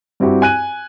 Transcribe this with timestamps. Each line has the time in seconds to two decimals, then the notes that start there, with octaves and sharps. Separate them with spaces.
0.20 G2 C4 E4 F#4 G4
0.42 G#5 F#6 D#7